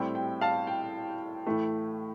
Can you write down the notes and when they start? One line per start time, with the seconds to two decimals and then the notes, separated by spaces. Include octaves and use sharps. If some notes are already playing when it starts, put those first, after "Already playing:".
Already playing: A2 G3 C4 E4 G5
0.15 G5
0.41 F5 A5
0.67 G5
1.47 A2 E3 A3